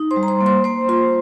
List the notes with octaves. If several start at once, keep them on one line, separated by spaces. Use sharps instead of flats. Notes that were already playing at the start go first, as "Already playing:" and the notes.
Already playing: D#4
C5 C6
G3
A#5
C5 C6
A#3
C5 C6
A#3 C5 C6
F4 C5 C6